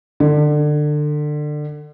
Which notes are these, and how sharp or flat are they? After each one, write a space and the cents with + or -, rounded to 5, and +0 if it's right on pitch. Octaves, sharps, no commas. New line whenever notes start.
D3 +25